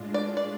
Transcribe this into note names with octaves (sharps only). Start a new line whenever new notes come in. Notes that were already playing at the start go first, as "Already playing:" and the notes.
Already playing: A2 G#3 D4 F4
D5
D5